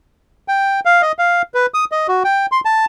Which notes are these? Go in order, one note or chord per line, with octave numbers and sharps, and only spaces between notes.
G5
F5
D#5
F5
B4
D#6
D#5
F#4
G5
C6
A5